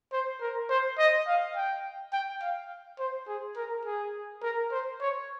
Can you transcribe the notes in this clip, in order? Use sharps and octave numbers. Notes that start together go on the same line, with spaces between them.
C5
A#4
C5
D#5
F5
G5
G5
F5
C5
G#4
A#4
G#4
A#4
C5
C#5